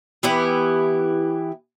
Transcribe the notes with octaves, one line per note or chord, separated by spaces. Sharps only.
E3 B3 E4 G4